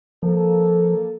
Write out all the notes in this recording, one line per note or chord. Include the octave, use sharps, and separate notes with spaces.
F3 A#3 A4